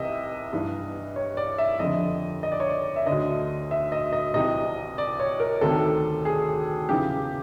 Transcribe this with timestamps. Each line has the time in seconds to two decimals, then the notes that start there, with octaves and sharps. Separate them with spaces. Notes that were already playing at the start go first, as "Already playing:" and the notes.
Already playing: C2 C3 E3 D#5 E5
0.53 G2 E3
1.16 C#5
1.37 D5
1.58 E5
1.79 F2 D3 D#5
2.43 D#5
2.52 D5
2.60 C#5
2.69 D5
2.96 E5
3.06 D3 D#5
3.12 D2
3.71 E5
3.92 D#5
4.13 D#5
4.34 C2 C3 E3 D#5
4.98 D5
5.20 C#5
5.40 A#4
5.61 D2 C3 D#3 A4
6.25 G#4
6.89 E2 C#3 E3 G4